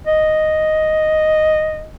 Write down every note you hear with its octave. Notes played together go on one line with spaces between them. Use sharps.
D#5